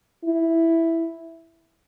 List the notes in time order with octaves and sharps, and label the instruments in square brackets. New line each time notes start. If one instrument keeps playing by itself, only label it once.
[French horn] E4